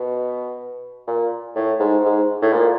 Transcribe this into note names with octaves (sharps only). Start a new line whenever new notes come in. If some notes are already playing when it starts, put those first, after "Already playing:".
Already playing: B2
A#2
A2
G#2
G#2
A2
A#2